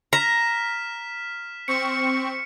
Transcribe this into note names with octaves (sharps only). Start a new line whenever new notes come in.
A#5 F6 B6 E7
C4 C#6 C#7